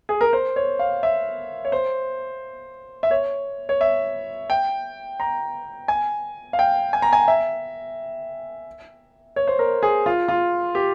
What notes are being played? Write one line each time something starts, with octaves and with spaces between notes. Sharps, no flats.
G#4
A#4
C5
C#5
F5
E5
C#5
C5
E5
C#5
C#5
E5
G5
A#5
G#5
F5
G5
G#5
A#5
G#5
E5
C#5
C5
A#4
G#4
F4
F4
G4